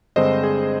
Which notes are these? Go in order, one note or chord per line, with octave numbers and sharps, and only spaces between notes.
G2 D3 G#3 C4 C5 D#5
G#4